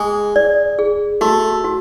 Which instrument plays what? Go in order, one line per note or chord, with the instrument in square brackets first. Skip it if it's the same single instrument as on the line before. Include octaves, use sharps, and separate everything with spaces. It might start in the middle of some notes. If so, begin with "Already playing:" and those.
Already playing: [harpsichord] G#3 [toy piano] G#4
[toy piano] D5
G#4
[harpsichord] A3 [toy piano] F#4
[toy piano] F#4